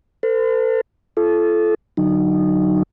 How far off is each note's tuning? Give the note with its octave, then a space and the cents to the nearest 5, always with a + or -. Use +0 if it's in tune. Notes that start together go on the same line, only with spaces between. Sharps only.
A4 +35 C5 -45
F4 -40 A4 -25
D3 +0 F#3 +0 D#4 -20